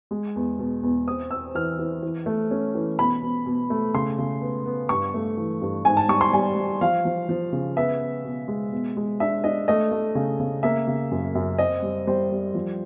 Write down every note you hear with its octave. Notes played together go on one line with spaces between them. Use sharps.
G#3
E2
B2
E2
C4 D#6
C4 E6
E3 F6
E3
E3
A3
C#4
E3
B2 B5
B2
B2
A3
C#3 C6
C#3
B3
B3
G2 C#6
A3
E3
G2
G#2 G#5
A5
G3 C#6
C6
G3 G#5
G3
F3 F5
F3
F3
C#3
B3 E5
B3
B2
G#3
B2
G#3
D4 E5
D4 D#5
A3 D#5
A3
C#3
C#3
A#3 E5
C#3
F#2
F#2
C4 D#5
G3
G3 C5
G3
F3